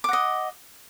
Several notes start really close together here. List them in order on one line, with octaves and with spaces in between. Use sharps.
D6 F#5 D#5